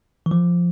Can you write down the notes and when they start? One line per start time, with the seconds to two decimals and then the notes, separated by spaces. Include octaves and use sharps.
0.26 E3
0.31 F3